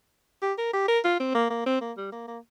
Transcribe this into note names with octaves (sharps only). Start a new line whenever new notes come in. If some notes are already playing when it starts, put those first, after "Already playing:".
G4
A#4
G4
A#4
F4
C4
A#3
A#3
C4
A#3
G3
A#3
A#3